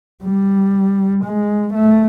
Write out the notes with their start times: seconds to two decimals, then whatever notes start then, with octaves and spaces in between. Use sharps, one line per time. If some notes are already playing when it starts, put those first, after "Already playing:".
0.24 G3
1.24 G#3
1.74 A3